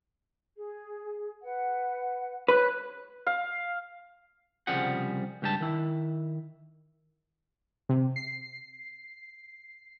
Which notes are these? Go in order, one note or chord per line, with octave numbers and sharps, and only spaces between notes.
G#4
B4 F#5
B4 C#5 F#6
F5
C2 C#3 F3 G3 G#4 F#5
C#2 G2 G4 A4 A5
D#3 E4
C3
C7